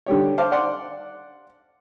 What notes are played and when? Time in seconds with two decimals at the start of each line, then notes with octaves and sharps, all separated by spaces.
0.06 D3 G3 G4 C#5
0.38 C5 F5 A5 D6
0.51 D5 F#5 C6 D6